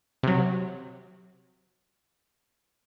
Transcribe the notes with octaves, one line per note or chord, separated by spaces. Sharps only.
C3 F#3